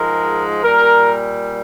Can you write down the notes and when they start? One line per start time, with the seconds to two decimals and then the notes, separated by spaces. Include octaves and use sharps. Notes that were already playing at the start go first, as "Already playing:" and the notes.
Already playing: G#2 F3 G#3 A#4
0.63 A#2 G3 A#4